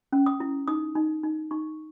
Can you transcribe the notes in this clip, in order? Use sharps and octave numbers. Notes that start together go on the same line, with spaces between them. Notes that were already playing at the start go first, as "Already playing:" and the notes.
C#4
D#6
E4
D#4 D#6
D#4
D#4
D#4 C#6